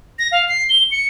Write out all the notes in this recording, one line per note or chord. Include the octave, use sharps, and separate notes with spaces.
A#6
F5
C7
G7
C#7